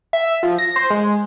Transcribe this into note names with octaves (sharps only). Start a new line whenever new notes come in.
E5
F3
A#6
C5
G#3